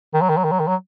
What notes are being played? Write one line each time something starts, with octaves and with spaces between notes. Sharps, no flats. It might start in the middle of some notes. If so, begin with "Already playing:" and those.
D#3
F#3
D#3
F#3
D#3
F#3
D#3
F#3